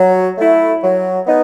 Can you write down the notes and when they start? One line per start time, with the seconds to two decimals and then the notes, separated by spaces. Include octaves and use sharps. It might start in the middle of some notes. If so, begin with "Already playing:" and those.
Already playing: F#3
0.38 A3 E4
0.83 F#3
1.27 B3 D#4